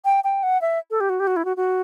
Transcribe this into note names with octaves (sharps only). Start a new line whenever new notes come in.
G5
G5
F#5
E5
A4
G4
F#4
G4
F#4
E4
F#4
F#4